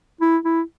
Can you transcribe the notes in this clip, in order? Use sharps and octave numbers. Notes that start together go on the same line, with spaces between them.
E4
E4